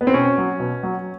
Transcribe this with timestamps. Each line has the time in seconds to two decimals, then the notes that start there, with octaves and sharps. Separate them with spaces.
0.01 B3
0.07 C4
0.14 B2 C#4
0.38 F#3
0.60 B2
0.83 F#3